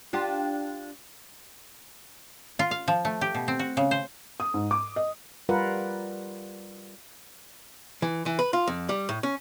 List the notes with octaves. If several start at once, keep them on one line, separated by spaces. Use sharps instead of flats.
D4 F4 G4
F4
F5
F3
A3
G4
B2
C4
F#4
C#3
C5
D#6
G#2
D6
D#5
G3 F4 A#4 B4 F#5
E3
E3
B4
F4
F2
G3
A2
C#4